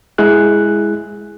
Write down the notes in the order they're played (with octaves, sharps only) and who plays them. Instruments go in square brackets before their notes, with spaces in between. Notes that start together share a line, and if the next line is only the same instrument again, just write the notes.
[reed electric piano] G#3 E4 G#4 F#6